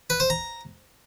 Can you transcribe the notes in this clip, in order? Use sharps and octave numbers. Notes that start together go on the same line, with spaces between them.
B4
C5
A#5